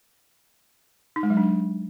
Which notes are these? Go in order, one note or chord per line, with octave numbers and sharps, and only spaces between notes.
D#4
G#3
F#3
D4